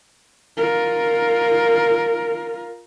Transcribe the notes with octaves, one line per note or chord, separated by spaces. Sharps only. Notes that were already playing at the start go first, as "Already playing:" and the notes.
F4 A#4